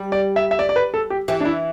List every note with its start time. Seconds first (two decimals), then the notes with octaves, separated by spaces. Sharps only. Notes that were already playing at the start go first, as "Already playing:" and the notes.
Already playing: G3
0.12 D5
0.36 E5
0.51 E5
0.59 D5
0.69 D5
0.76 B4
0.94 A4
1.10 G4
1.28 E3 G4
1.41 D4
1.45 E4